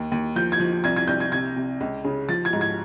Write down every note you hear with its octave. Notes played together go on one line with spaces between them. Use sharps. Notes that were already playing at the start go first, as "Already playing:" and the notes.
Already playing: D#2
D#2
F3 G6
G#6
F3
C2 G#6
G#6
C2 G6
G#6
C3 G#6
C3
C#2
C#3
F3 A6
G#6
G#2
G#6